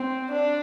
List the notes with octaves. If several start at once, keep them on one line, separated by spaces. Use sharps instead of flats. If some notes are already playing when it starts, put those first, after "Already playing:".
Already playing: C4
D4